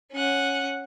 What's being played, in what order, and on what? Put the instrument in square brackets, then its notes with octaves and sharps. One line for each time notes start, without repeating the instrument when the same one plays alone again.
[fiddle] C#4 F#5